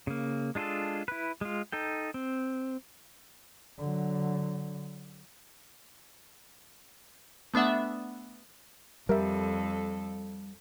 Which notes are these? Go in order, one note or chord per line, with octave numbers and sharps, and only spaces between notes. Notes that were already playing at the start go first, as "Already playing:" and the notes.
C#3 A#3
G#3 D4 F4 G#4 A4
E4 B4
G#3 F4
D#4 A4 G5
C4
D3 F#3
A3 B3 D4 E5 F#5
F2 G3 A4 A#4 E5